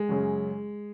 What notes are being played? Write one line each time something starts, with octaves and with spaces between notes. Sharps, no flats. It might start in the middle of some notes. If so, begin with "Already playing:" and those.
Already playing: G#3
F#2 C#3 F#3